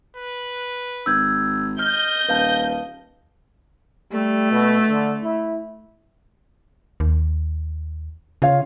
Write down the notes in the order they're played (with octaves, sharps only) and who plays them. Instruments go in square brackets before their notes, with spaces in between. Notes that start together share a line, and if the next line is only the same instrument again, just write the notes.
[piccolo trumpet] B4
[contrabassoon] G#1 [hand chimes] E6 G6 G#6
[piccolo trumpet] D#5 [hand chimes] F6 [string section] G6
[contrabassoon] D#1 [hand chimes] B4 F5 A5
[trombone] G3 [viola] A3
[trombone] B2
D3
E4
[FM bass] D#2
[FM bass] C#3 [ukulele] F4 C#5 F5